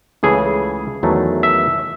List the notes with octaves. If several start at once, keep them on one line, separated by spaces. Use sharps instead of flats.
C#2 C#3 E3 A3 G#4
E2 D#3 F#3 A3
E5